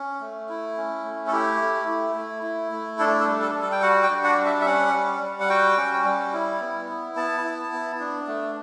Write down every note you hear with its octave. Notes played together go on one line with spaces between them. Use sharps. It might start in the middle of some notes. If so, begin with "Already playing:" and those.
Already playing: C#4
A3
E4
C#4
A3
A4
E4 G4
A3
E4
A3
E4
A3
D4 A4
A4
G3
A4
G3
A4
G5
F#4 F#5
G5
D4
F#5
G3
E5
E5
C#4 F#5
G3
G3
F#5
F#4 G5
C#4
G3
E4
B3
E4
B3 A5
E4
B3
D4
A3